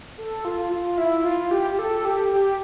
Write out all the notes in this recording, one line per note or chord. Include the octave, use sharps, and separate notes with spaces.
A4
F4
F4
E4
F4
G4
G4
A4
G4
G4